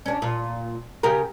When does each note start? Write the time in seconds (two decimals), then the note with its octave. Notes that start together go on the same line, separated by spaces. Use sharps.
0.06 C#4 D4
0.22 A#2
1.03 C#3 G4 A#4